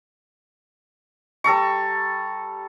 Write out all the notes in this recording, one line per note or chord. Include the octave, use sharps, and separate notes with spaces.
G3 A4 A#5 C#6